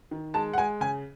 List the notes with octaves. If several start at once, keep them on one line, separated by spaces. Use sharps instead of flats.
D#3
G#3 A5
F#5
G#3 G#5
C#3 G#5